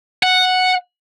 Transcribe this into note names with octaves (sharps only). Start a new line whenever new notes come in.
F#5